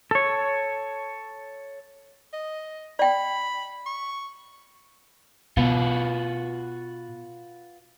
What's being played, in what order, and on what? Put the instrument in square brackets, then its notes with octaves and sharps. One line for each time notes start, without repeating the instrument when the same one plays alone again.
[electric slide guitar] A4 C#5
[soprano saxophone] D#5
[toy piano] D5 G5 [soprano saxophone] B5
[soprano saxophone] C#6
[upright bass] B2 [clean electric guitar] F4 F#4 B4